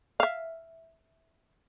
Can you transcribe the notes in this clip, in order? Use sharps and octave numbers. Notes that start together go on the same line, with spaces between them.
E5 F5